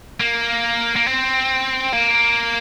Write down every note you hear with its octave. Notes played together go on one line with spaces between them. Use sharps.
A#3
A#3
C4
A#3